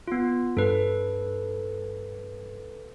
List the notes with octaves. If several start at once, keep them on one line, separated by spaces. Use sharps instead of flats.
B3 F4
G2 A4 B4